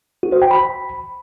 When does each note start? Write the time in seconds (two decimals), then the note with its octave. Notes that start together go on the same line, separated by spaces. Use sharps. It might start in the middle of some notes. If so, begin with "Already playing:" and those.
0.23 F#4
0.32 C5
0.42 G5
0.51 B5